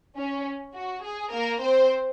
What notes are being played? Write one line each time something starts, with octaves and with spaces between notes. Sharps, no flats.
C#4
F#4
G#4
A#3 A#4
C4 C5